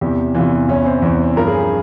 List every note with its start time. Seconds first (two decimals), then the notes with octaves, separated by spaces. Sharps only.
0.01 E2 C3 E3 G4
0.35 E2 C3 E3 F4
0.68 E2 E3 C#4
0.86 C4
1.02 E2 E3
1.36 G2 F3 A#4
1.47 G#4